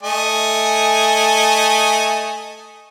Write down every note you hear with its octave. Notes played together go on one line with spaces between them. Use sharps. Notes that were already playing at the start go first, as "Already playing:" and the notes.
A3 D#5 G#5